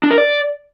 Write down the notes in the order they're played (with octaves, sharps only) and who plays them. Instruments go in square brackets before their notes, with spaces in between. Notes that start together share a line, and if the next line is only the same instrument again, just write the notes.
[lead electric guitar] D4
A#4
D5